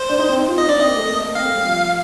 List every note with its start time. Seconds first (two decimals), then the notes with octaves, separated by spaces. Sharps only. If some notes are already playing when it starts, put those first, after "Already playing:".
Already playing: C5
0.09 D4
0.19 D#4
0.29 C4
0.38 D#4
0.48 F4
0.58 D#4 D#5
0.67 D4 D5
0.77 C4 D#5
0.87 A#3
0.97 A3
1.09 A#3
1.23 A#3
1.35 C4 F5
1.46 A3
1.55 G3
1.65 F3